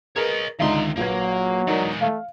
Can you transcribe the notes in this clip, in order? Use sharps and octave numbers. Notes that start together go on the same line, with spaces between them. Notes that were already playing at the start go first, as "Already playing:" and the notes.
G#4 A#4 B4 C#5 D#5
C#2 D3 D#3 D#4 E5 C6
A#1 F#3 A#3 B4 G#6
E3 G#3 D#4 A#4 D5
A3 F5